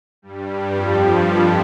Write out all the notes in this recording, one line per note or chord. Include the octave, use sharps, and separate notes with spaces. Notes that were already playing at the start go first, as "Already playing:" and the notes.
G2 G3
F2 F3